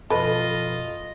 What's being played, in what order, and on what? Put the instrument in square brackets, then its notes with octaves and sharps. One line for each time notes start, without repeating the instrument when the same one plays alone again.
[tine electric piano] F#2 B2 F3 [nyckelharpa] F4 D#5 [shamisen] A4 B4